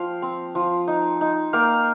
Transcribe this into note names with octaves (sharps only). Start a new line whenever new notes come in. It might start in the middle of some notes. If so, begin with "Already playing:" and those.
Already playing: F3 F5 G5
C4
F3
D#4
D#4
A#3 F5 G5